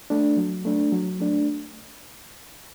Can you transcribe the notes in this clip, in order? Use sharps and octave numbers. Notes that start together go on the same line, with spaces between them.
A3 D4
F#3
A3 D4
F#3
A3 D4